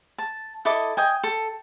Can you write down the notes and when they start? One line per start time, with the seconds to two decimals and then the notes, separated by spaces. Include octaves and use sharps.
0.18 A5
0.65 E4 A4 D#5 D6
0.97 D#5 G5 G#5
1.24 A4